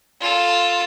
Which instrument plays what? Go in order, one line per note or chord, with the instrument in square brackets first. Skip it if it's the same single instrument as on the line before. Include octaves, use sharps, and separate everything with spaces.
[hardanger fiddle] F4 A4